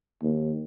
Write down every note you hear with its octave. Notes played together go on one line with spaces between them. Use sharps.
D#2